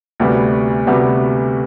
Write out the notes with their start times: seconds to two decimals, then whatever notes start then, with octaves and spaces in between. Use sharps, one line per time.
0.20 D2 C3 G3 B3 F#4
0.87 D2 C3 G3 B3 F#4